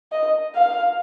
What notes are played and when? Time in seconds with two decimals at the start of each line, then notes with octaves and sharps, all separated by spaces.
0.12 D#5
0.55 F5